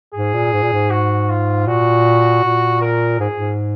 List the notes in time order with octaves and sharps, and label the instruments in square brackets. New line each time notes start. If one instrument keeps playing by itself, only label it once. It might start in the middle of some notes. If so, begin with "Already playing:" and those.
[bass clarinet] G#2 [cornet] G#4
[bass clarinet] A#2
G#2
A#2
G#2
[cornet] F#4
F4
[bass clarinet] A#2 [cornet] F#4
[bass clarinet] A#2
[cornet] A#4
[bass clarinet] G#2 [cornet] G#4
[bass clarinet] G#2